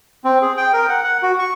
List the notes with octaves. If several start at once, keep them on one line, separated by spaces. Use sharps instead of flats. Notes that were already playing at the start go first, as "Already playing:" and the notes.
C4
G#4
G5
A#4
F#5
F#5
F#4
C#6